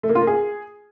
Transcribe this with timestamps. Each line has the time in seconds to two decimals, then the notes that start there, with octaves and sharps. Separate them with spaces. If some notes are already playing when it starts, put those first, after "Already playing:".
0.03 A3
0.09 A#3
0.15 F4
0.21 A#3
0.27 G#4